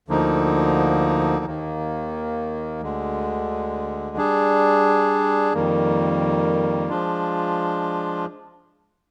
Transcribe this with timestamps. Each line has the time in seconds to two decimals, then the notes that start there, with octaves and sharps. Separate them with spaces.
0.08 D2 D3 F3 A#3 D#4
1.45 D#2 D#3 A#3
2.81 D2 D3 G#3
4.17 G3 D4 G#4
5.54 F2 D#3 G3 A#3
6.89 F3 G#3 D4 F4